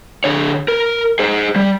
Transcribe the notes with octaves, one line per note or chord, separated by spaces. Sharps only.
D3 C#5
A#4
G#4 C5
G3